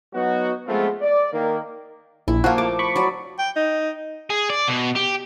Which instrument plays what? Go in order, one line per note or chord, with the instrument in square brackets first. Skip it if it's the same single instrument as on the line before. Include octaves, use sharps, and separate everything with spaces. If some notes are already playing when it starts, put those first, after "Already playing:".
[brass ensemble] F#3 B3 D#4 F#4
F3 G#3 A3 B3 C4 F4
D5
D#3 A#3
[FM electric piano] A#1 [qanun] E4
[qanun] F3 A#3 [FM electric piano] F4 F#4
[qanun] A3 [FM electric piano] D6
[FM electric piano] B5 C#6 D6
[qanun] F#3 D5
[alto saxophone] G5
D#4
[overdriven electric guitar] G#4
D5
B2
G4